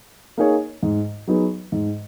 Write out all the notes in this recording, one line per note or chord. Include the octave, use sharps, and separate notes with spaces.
A#3 D#4 G#4 C#5
G#2
F#3 B3 D#4 G#4
G#2